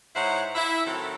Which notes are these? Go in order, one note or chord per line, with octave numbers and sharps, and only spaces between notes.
G#2 D#4 E4 C5 C#5 F#5
E4
A2 D#3 F#3 C4 A4